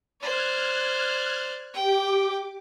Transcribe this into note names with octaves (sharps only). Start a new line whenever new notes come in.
C5 D5 F6 F#6 G#6
G4 G5 D6